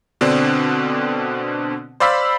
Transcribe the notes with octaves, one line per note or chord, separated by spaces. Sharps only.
B2 D3 C4 D4
C5 D5 F5 B5 E6 B6